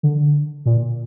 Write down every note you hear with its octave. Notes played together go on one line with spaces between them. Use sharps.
D3
A#2